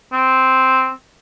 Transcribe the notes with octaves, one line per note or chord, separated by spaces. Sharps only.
C4